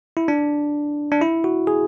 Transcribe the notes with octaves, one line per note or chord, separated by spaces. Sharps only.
E4
D4
D4
E4
F#4
G#4